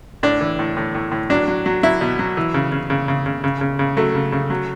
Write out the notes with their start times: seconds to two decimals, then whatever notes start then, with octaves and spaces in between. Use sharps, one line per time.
0.23 A2 D4
0.41 E3
0.59 A2
0.77 A2
0.95 A2
1.12 A2
1.30 F#3 D4
1.48 F#3
1.66 F#3
1.83 F#3 E4
2.01 B2
2.19 F#3
2.37 E3
2.54 C#3
2.72 C#3
2.90 C#3
3.08 C#3
3.26 C#3
3.44 C#3
3.61 C#3
3.79 C#3
3.97 F#3 A3
4.15 C#3
4.32 C#3
4.50 F#3